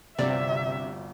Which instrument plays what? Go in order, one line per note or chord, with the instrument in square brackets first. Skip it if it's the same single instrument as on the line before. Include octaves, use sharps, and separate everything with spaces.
[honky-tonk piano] G1 D2 [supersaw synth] C3 [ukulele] D5 [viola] E5